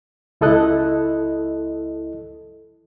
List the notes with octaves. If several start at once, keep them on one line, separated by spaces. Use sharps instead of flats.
C#2 E4 A4 D#5 F#6